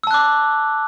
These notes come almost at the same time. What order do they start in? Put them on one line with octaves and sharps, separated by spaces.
E6 A5 F#6 D6